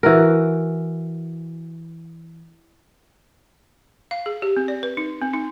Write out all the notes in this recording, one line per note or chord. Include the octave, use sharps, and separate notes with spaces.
E3 F#4 A#4
F5
G#4
G4
C4
D5
B4
D#4
C4
D#4